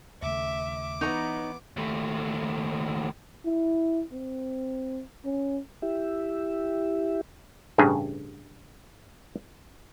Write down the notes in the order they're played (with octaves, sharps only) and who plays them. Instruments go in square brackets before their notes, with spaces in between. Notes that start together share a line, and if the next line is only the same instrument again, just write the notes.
[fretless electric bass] D#2 C#3 A3 [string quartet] E5 [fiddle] D6
[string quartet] E3 B3 [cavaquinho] D#4 C#5 A#5
[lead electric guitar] D#2 A3
[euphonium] E4
C4
C#4
[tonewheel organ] E4 G4 E5
[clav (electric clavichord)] A1 G2 C#3 G#4